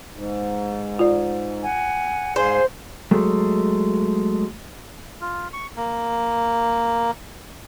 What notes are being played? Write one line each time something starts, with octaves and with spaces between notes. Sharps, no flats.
G#2
F4 D5
F#5 G#5
G#2 G#4 C5 F5
F#3 G#3 A3
F4
C#6
A#3